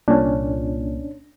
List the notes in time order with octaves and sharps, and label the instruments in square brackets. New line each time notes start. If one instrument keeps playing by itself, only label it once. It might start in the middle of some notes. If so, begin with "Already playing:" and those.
[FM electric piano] C2 A#2 [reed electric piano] C#4 D4